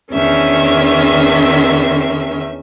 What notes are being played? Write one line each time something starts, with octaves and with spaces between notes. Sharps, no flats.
E2 D#3 C#4 D4 E5